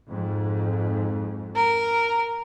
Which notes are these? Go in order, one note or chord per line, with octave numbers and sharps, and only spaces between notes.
F2 G#2
A#4